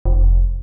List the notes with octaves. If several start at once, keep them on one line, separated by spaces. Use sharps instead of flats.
F1